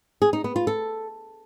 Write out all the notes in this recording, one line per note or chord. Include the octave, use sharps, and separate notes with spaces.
G#4
D#4
B3
F4
A4